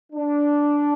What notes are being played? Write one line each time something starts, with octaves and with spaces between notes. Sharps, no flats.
D4